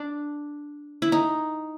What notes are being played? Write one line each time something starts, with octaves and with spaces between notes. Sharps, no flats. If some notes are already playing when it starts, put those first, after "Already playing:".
Already playing: D4
E4
D#4